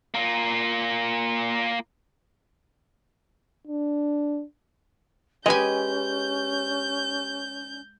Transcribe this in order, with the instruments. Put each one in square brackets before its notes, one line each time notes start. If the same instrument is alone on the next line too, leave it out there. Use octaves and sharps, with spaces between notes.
[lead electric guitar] A#3 F4
[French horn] D4
[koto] G#3 G#5 [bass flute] C#4 [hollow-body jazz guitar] G4 B4 D#5 [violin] G6